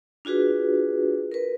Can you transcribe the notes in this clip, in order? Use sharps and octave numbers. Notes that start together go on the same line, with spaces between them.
D4 F4 F#4 G#4 B4
A#4 B4